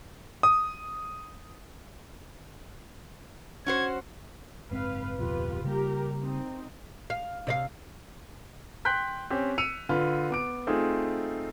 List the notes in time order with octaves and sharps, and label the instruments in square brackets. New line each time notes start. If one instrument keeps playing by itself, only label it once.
[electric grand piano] D#6
[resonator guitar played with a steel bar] C#4 F#4 C5 [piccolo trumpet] G#6
[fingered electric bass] F#1 G#2 C4 [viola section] B4 F5
[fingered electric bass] D1 F2 B2 [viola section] F4 G4 B4
[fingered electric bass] C#3 G3 A#3 [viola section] G4 A#4
[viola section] C4 D#4
[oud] F5
C3 D#5 F5
[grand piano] G5 C6 F#6 G6 B6
C4 C#4 G4
E6 C#7 D#7 F7
D3 F4 B4
B3 D6 D7
A3 C4 D#4 F4 G#4